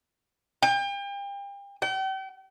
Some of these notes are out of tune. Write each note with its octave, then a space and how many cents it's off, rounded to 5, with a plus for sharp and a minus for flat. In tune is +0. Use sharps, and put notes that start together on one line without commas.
G5 +35
G5 -40